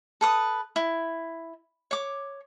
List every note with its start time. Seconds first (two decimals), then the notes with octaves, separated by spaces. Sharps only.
0.21 A4 B4 D#6
0.76 E4
1.91 C#5 D6